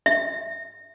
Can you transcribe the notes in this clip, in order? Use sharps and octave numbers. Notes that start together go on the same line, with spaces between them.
E5